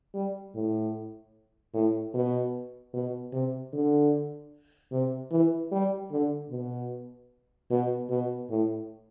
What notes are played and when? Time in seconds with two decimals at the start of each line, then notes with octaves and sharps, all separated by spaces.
0.14 G3
0.55 A2
1.74 A2
2.14 B2
2.93 B2
3.32 C3
3.73 D3
4.92 C3
5.31 E3
5.72 G3
6.11 D3
6.51 B2
7.71 B2
8.10 B2
8.50 A2